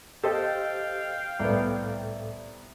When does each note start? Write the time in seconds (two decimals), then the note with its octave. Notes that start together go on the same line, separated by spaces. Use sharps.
0.24 G4 A4 C5 D#5 F5 G5
1.40 C2 A2 B3 A4 D5